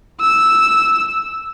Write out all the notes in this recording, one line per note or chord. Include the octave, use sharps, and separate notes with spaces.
E6